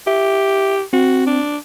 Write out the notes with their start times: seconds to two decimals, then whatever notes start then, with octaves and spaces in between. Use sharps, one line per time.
0.07 G4 E5
0.93 C4 F#4
1.27 D4